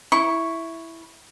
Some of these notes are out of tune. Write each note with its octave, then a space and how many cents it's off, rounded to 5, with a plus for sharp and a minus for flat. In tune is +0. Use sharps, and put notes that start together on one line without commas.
E4 +0 C#6 +0